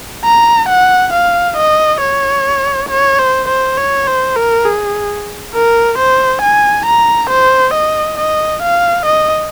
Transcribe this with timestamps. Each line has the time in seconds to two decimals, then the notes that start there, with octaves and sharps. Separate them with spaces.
0.24 A#5
0.69 F#5
1.13 F5
1.57 D#5
2.01 C#5
2.89 C#5
3.19 C5
3.48 C5
3.78 C#5
4.07 C5
4.36 A#4
4.65 G#4
5.53 A#4
5.98 C5
6.42 G#5
6.86 A#5
7.30 C5
7.74 D#5
8.18 D#5
8.62 F5
9.06 D#5